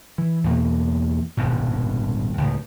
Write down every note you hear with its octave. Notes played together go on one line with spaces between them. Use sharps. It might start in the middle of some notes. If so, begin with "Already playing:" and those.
E3
E2 B2 A#3
D#1 G#1 G2 B2
C#2 A2